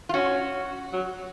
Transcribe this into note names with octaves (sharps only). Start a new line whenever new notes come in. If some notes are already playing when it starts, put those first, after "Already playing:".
F4
C#4 F#4
F#3